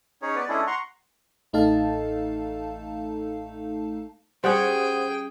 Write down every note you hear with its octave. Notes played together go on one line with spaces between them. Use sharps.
C#4 D#4 G#4 C#5
B3 B4 D5
G#3 C#4 D4 E4 G#4 A4
F#5 A#5 C6 C#6
A1 A3 D#4 A4 F5 A5
G3 C#4 G#4 C5 F#5 G5 D#6